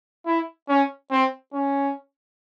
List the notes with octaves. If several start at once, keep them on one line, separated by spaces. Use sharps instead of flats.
E4
C#4
C4
C#4